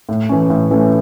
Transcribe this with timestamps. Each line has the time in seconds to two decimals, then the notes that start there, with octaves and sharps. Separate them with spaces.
0.09 A2
0.29 E3 A3 C#4
0.50 A2
0.71 E3 A3 C#4